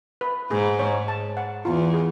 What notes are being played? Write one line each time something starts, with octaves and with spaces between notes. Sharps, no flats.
B4
G#2 G#4
C#5
A5
F#5
E2 F4
G#4